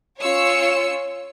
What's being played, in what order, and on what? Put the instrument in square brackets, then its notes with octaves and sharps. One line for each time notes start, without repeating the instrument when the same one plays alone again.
[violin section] C#4 F4 C#5 E6 C#7